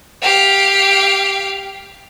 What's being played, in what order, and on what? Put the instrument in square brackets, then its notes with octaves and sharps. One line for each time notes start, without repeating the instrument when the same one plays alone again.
[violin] G4 F5